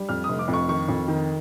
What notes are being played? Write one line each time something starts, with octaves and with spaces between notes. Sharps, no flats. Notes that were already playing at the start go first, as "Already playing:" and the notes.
Already playing: G3
F2 F6
F1 D#6
D6
F2
C#6
D#3 C#6
F2
D#3